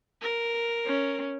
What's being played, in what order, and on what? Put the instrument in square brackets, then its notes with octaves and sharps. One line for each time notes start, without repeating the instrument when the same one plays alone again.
[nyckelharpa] A#4
[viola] C#4